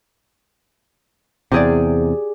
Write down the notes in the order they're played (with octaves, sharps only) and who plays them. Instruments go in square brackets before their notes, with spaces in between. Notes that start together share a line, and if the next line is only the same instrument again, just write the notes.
[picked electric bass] E2 C3 [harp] G4 G#4 D5